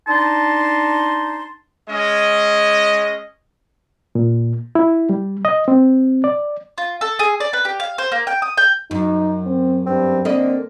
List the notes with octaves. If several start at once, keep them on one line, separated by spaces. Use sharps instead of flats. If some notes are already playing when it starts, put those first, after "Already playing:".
D4 D#4 A5 C6
G#3 C#4 D#5
A#2
E4
G3
D#5
C4
D5
F4
A4
G#4
D5
B4
G4
F5
C5
A#3
G5
D#6
G5
F#2 D#4
C4
G2 C4
D3 A#3 C4 D#5